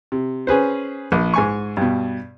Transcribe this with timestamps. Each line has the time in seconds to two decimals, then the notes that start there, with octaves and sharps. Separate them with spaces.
0.12 C3
0.47 C#4 G#4 B4 C5
1.12 A#1
1.34 G#2 G#5 C#6
1.77 G2 B2